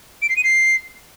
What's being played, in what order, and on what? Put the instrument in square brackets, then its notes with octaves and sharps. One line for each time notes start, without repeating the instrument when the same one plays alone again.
[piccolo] D7
C7
D#7
C7